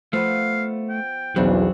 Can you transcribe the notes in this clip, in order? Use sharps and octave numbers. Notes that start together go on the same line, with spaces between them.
F3 A3 B3 B4 F5
G5
B1 E2 C#3 F#3 G3 C4 D4